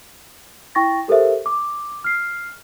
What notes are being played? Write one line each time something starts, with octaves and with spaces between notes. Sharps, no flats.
E4 G5 C#6 A6 A#6
G4 A4 A#4 C5 E5
D6
F6 C7